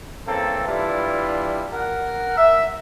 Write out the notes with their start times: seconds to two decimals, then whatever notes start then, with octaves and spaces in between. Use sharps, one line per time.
0.27 C#3 E3 A#3 C4 A4
0.67 E3 G3 D4 E4 F4
1.72 A#4 F#5
2.37 E5